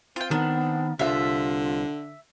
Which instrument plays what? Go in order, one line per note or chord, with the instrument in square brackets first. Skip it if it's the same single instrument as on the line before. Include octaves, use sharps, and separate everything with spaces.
[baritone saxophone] C4 [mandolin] F4 G5
[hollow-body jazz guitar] D#3 [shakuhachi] B3 [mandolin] D4
[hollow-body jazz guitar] C2 F5 [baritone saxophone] D3 [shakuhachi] F4 [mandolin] E5